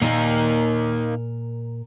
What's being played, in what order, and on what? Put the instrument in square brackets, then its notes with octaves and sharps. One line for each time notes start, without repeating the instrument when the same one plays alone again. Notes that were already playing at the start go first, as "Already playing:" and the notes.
[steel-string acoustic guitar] A#2 A#4 [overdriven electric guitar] A#3 D#4